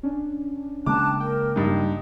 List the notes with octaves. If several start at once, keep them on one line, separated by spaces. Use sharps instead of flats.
C#4 D4
C#3 G#3 A#3 G5 A5 D6 F#6
A#4 G5
G2 D#4